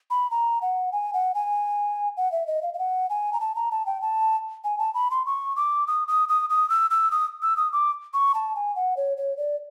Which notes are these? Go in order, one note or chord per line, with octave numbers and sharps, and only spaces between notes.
B5
A#5
F#5
G#5
F#5
G#5
F#5
E5
D#5
F5
F5
F#5
G#5
A#5
A5
A#5
A5
G5
A5
G#5
A5
B5
C6
C#6
D6
D#6
D#6
D#6
D#6
E6
E6
D#6
E6
D#6
D6
C#6
A5
G#5
F#5
C#5
C#5
D5